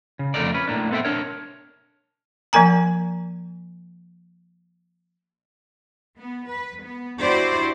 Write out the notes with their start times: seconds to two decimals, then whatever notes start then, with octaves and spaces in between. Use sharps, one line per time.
0.19 C#3
0.34 F2 A#2 D3 A3 A#4 D5
0.54 C#4 B4
0.67 A2 A#3 D4
0.91 B3 C4 A4 C5 E5 G5
1.05 D4 A#4 C#5
2.53 F3 A#3 A#4 G#5 A#5
6.18 B3
6.49 B4
6.84 B3
7.21 D4 E4 F#4 G4 C5 D5